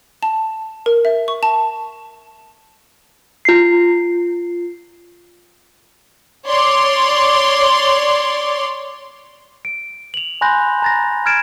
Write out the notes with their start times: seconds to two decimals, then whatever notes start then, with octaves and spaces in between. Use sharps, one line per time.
0.23 A5
0.86 A#4
1.05 E5
1.28 C#6
1.43 A5
3.45 F4 C7
6.47 C#5 D5 C6
9.65 D7
10.14 F7 F#7
10.41 G#5 B5 C6 F#6 G6 A#6
10.82 A#5 A6 A#6
11.26 F6 G#6 A6 D7 E7